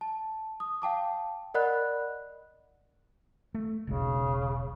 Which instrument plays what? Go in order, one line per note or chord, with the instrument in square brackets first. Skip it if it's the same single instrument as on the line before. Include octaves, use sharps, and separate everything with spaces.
[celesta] A5
D#6
F5 G5 A5 D6
A#4 D5 D#5 F#5 B5 F#6
[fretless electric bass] A3
[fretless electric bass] E1 B1 G#3 [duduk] C#3